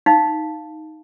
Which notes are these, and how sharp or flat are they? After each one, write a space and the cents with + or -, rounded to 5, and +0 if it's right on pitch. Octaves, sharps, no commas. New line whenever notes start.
D#4 +5 F5 +0